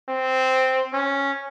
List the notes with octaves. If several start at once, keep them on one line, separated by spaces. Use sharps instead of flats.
C4
C#4